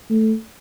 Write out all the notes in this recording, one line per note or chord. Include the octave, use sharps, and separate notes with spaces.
A3